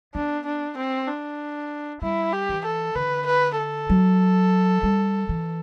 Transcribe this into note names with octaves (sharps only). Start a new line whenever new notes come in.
B3 D4
D4
C4
D4
G3 E4
G4
E3
A4
D3 B4
B4
A4
F#3
G3
E3